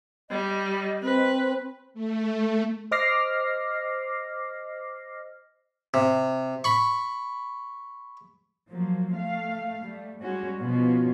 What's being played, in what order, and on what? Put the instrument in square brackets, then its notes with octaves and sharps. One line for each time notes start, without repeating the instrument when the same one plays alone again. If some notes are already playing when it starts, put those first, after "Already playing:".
[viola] G3 [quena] D#5
[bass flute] C4 [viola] B4
[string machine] A3
[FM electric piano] C5 D#5 D6 F6 A#6 C7
[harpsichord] C3
B5 C#6
[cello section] F3 F#3 A#3
A3 F5
G3 A3
G3 G#3 C#4 F#4
B2 F3 B3 C#4 F4 F#4